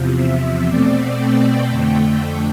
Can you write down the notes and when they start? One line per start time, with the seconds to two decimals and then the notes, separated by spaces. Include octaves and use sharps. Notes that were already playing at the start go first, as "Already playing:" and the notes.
Already playing: E2 C3 F3
0.16 E5
0.66 B2 A3 C4 D5
1.18 G5
1.68 F2 D3 A3
2.20 G5